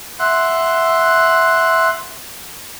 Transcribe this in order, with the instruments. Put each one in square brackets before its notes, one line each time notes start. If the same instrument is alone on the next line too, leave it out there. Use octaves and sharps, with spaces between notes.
[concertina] E5 F#5 C6 F#6